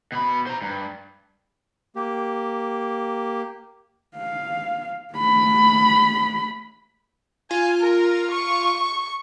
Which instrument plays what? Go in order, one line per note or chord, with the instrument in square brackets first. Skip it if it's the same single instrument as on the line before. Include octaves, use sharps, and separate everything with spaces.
[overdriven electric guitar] B2 B5
C5 A#5
G2
[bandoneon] A#3 G4
[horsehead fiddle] F5
A3 B5
[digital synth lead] F4 [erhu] G#5
[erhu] A#4
C#6